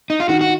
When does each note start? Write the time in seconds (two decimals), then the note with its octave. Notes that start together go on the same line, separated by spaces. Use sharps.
0.10 D#4
0.20 F4
0.29 D#3 F#4
0.41 F#4